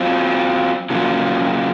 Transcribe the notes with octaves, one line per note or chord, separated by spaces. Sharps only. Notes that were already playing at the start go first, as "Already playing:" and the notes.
Already playing: F#3 C4 F4
F2 C#3 F#3 A#3 F4